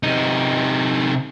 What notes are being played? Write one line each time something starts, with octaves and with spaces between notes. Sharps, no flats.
C3 D#4